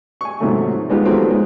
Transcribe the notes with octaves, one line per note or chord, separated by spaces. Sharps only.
G#5 C#6
G#2 C3 D#3 F3 F#3 A3
G3 G#3 B3 D#4 F4 G4
D#3 F3 F#3 G#3 A3 C4
G#3 B3